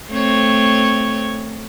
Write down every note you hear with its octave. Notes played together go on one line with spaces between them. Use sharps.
A3 C4 C#5